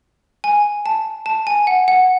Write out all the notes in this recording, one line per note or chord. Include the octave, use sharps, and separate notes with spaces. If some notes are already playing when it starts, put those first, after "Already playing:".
G#5
A5
A5
G#5
F#5
F#5